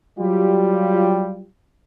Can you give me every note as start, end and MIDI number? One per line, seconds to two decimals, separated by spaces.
0.19 1.45 54
0.19 1.45 55
0.19 1.45 65
0.19 1.45 67